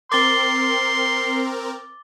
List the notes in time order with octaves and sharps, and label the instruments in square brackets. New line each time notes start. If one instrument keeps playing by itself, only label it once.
[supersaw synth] C4 A#4 [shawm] C6 [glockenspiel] D6 A6 G7